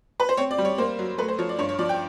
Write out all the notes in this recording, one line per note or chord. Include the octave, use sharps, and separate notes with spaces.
B4
C5
C4 C#5
D5
G3
C#5
A#3 C5
F#3
A3 B4
C5
F3 C#5
D5
G2 C#5
C#5
F3 D5
G5